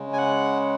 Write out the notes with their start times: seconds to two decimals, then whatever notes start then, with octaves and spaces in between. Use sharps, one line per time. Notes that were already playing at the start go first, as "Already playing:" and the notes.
Already playing: C#3 G#3
0.13 G#5
0.18 F#5